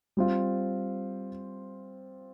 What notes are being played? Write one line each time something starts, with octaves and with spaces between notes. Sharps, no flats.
G3 C4 F4